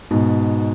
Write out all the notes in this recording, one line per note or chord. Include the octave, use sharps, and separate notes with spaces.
G#2 B2